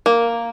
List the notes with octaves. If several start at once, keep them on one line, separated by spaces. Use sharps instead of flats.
A#3